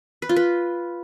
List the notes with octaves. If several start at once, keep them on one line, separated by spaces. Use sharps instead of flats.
B4
F4
B4